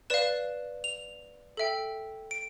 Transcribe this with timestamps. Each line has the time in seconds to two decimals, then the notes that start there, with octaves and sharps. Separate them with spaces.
0.10 B4 D5 F5 E7
0.84 F7
1.57 A4 E5 G5
2.31 D7